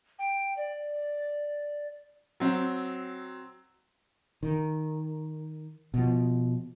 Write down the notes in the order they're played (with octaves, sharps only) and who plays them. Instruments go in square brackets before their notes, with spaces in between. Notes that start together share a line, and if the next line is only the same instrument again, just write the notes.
[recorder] G5
D5
[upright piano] F#3 C4
[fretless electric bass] D#3
B2 F3